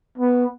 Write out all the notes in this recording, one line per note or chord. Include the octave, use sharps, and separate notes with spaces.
B3